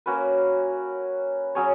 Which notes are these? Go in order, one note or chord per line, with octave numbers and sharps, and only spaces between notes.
A#3 C#4 F#4 B4
F#3 C#4 G#4 C#5